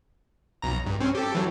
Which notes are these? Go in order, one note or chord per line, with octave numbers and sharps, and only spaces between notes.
B1 A#5
G2
C4 C#4
G4 A4
E3 F#3